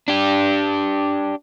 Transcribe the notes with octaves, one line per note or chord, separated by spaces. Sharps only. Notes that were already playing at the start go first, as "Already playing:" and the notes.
D4 G4